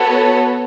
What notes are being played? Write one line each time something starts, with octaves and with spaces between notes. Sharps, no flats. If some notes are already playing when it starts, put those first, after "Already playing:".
Already playing: B3 F#4 A4 C#5